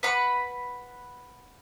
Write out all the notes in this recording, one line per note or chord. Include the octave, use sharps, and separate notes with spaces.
B4 F#5 B5